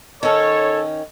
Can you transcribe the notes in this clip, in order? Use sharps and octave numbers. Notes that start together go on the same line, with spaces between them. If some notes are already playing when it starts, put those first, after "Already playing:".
D#3 C#4 A4 C#5